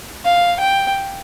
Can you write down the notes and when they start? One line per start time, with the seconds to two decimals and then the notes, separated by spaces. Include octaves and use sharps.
0.25 F5
0.60 G5